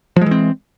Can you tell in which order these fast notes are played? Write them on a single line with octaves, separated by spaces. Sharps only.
F3 G#3 E3 C4